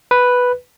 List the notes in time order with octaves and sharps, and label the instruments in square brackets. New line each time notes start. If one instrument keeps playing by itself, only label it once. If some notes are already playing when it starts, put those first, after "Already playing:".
[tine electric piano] B4